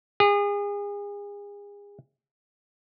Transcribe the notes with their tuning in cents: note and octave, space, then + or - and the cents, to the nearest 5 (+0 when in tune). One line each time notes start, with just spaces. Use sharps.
G#4 -35